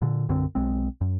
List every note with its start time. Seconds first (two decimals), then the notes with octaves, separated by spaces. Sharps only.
0.02 A#2 D3
0.28 B1 F#2 D3 C4
0.55 B1 G#3 C4
1.01 F#2